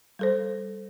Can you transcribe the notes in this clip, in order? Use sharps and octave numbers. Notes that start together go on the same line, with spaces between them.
G3 A4 C5